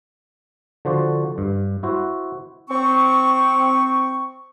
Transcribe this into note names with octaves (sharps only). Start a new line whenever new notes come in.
D3 F3 F#4 C5 D5
G2
E4 F#4 C5
C4 C#6